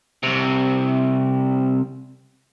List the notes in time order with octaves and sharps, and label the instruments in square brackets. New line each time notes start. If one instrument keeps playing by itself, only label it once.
[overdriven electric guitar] C2 C3